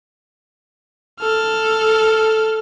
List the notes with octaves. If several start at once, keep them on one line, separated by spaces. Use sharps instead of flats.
A4 F6